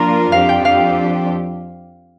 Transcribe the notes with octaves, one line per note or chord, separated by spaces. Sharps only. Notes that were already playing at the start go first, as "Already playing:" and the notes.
Already playing: F3 A#3 D4 F4 A#4 A#5 C6
F2 F3 D4 G4 F5
G5
F5